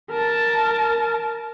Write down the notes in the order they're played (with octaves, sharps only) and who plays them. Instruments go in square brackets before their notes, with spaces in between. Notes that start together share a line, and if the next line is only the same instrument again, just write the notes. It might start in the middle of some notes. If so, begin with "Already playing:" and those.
[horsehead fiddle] A#4 A5